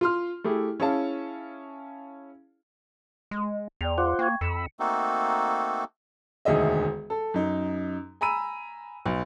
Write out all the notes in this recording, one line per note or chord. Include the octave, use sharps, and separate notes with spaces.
F4 C6 F6
A3 E4 G4 G#4
C#4 E4 G#4 C#5 F5 A5
G#3
E2 D5 G5 F7
F4 C5 F#5 C6 D6
A#3 G5 C#6 G#6
F2 B5 E6 C#7
A3 A#3 C4 D#4 F#4 A4
E1 D2 D#3 G#4 D#5 E5
A4
F#2 D#4
G#5 A#5 B5 E6 D#7
B1